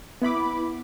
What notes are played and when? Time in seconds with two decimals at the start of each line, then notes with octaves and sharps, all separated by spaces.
0.22 B3 E4 B5 D6